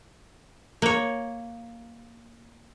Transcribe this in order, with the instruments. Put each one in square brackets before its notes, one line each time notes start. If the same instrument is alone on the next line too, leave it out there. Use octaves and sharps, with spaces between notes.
[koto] A#3 C#5